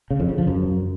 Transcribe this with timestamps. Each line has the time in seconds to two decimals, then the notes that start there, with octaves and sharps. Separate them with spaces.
0.11 C#3
0.20 F2
0.29 C#3
0.38 F3
0.47 F#2